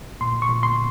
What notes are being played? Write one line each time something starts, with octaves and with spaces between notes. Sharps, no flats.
A#2 C6
C#6
A#2
C6